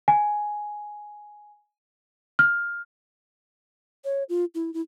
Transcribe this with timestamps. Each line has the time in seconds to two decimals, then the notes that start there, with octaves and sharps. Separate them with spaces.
0.08 G#5
2.39 F6
4.05 C#5
4.29 F4
4.55 E4
4.74 E4